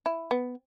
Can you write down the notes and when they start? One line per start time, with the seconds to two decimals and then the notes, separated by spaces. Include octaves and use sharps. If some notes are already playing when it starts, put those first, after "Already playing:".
0.06 E4
0.31 B3